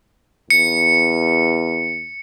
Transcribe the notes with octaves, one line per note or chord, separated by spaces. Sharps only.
E2 C#7